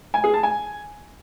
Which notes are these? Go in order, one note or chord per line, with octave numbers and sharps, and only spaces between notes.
G#5
G#4
A5
G#5